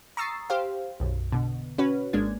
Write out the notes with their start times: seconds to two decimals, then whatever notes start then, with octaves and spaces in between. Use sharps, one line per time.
0.17 A#5 C#6 D#6 E6 A6 C7
0.50 G4 C5 F5
1.00 B1 F#2
1.32 B2 D3
1.78 C#4 F#4 B4 C#5
2.13 G#1 G#3 A#3 D4 G#6